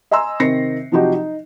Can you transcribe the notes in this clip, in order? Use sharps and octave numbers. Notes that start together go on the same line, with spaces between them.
D#5 G#5 A#5 C6 E6
C3 D#3 C4 A#6 C7 C#7
C3 F3 F#3 D#4 F#4 G4
D#4